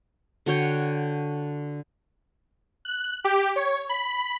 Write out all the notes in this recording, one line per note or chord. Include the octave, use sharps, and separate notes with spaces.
D3 F#4 C#5 G5
F#6
G4
C#5
B5